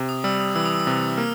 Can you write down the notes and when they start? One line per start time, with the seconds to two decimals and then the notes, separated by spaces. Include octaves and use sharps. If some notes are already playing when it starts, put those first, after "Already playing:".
Already playing: C3
0.09 D#6
0.24 G3 E6
0.40 D#6
0.55 E3 E6
0.65 D#6
0.75 E6
0.87 C3
1.17 A#3 F6